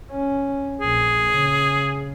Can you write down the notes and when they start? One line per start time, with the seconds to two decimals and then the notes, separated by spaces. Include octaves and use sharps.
0.11 C#4
0.81 A#1 G#4
1.30 C#3